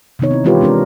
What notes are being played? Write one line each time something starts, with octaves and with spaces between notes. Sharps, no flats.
C3 D#3 B3 D#4 C#5
C4 E4
E3 G#3 F4 G4 B4 C#5
G#3 C4 D4 A#4